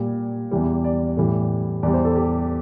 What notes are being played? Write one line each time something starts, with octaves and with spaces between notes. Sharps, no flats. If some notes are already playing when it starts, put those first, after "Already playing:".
Already playing: A#2 G3
E2 E3 G3
D5
A2 E3 G3
E2 E3 G3 D5
C5
A4
G4